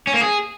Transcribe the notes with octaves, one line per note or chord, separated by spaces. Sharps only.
C#4
A#3
G#4